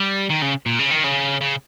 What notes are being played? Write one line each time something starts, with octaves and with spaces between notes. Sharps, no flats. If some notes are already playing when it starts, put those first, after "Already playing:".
Already playing: G3
D#3
C#3
A#2
C#3
D#3
C#3
C#3